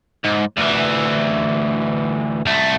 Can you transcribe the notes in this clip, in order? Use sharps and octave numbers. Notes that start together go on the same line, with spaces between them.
G#2
D2 E3
C2 A3